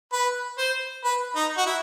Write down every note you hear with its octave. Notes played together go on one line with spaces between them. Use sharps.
B4
C5
B4
D#4
F#4
E4